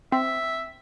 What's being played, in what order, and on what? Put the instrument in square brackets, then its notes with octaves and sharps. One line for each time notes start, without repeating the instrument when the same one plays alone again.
[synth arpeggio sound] C4 [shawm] E5